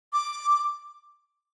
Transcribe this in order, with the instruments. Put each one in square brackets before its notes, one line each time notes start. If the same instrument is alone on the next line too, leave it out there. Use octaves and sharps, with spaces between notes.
[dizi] D6